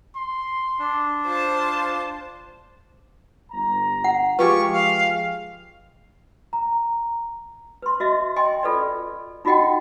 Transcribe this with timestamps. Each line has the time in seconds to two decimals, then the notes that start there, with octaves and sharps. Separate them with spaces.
0.16 C6
0.79 D4
1.26 F4 C5 A5
3.52 G1 A#5
4.04 F#5
4.39 F3 G#3 F4 G4 G#4 B4 C#6
4.73 F5
6.53 A#5
7.82 B4 C6
8.00 F#4 D#5 E5
8.36 D#5 G5 G#5 C6
8.63 F4 A4 B4 D5
9.45 D#4 F4 F#4 D#5 F#5 G5